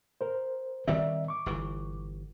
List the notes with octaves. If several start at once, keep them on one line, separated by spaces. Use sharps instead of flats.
A#4 C5
D#3 G3 C4 D5 E5
C#6 D6
G1 E3